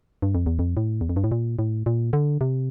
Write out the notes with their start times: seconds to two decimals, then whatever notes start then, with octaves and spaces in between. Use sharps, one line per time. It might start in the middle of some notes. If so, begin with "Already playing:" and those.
0.22 G2
0.35 F2
0.46 E2
0.59 F2
0.77 A2
1.01 E2
1.09 F2
1.16 G2
1.24 A2
1.32 A#2
1.59 A2
1.86 A#2
2.13 D3
2.41 C3